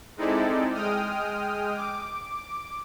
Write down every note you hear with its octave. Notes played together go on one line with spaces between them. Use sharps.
G#3 C4 D#4 E4 A4 D5
G#3 G5 D#6 F6
D6